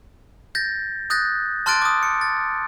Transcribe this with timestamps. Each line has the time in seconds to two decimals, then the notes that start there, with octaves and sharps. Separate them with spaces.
0.55 G6 A6 A#6
1.10 D#6 F#6 G6 A6 A#6
1.66 A5 C6 F6 F#6 A6 D7
1.82 D6 D#6
2.03 C#7
2.21 A6